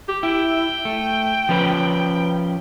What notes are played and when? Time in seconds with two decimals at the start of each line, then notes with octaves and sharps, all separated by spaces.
0.09 G4
0.23 E4 G5
0.85 A3
1.49 F3 C#4 B4